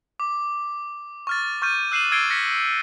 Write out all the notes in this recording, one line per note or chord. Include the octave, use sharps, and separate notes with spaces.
D6
C#6 F6 A6
C#6 F6 G6 A6 D#7
E6 F#6 C7 D#7 E7 F#7
E6 G#6 A6 C7 D7 G7
F6 A#6 B6 C#7